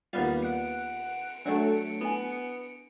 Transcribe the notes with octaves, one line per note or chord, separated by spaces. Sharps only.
D#2 G3 B3 F4 F5
F#5 C#7 D7
F#3 A3 D4 F#4 D5 F#5
B3 E4 G#5